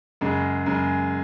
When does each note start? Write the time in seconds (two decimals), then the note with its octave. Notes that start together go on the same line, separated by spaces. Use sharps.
0.21 F#2 C#3 G#3
0.66 F#2 C#3 G#3